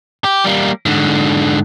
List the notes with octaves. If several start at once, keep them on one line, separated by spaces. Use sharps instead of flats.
G4
G3 A#3
G#2 D3